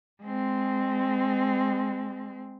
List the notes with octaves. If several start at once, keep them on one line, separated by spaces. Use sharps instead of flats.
G#3 C4